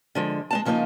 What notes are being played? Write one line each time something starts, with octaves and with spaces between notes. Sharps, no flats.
D3 F3 G#3
G#3 D4 A5
C#3 F3 A#3 D#4 F4